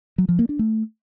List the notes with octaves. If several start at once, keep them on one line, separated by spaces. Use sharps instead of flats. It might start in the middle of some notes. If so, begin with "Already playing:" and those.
F#3
F3
A#3
D4
A3